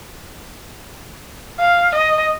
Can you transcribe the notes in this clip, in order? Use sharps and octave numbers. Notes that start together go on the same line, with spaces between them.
F5
D#5